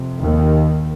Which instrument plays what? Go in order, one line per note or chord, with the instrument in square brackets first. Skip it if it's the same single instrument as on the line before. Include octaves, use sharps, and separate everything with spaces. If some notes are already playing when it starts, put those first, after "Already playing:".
Already playing: [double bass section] F2 C3
D#2 D#3